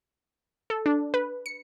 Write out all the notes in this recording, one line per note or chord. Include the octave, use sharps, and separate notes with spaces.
A4
D4
B4
C#7